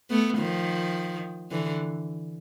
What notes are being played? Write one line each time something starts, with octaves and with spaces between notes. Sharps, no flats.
A3 B3
D#3 F3
D3 E3